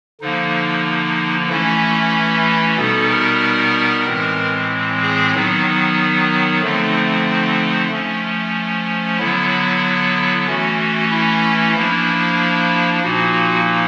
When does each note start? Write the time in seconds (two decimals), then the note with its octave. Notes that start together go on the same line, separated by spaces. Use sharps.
0.21 D3 F3 A#3 D#4
1.49 E3 A3 C#4 E4
2.77 B2 G3 B3 D#4 A4
3.09 A#4
4.06 A2 E3 G#3 C4
5.02 G#4
5.34 D#3 F#3 B3 D#4
6.62 D3 F3 A3 C4 D#4
7.90 F3 A3 C#4
9.18 D3 F#3 B3 E4
10.47 E3 A3 C#4 F#4
11.11 E4
11.75 F3 A#3 D4 E4
13.03 A#2 F3 A#3 D#4 F#4